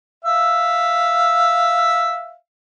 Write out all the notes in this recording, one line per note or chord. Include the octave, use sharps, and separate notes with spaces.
E5 F5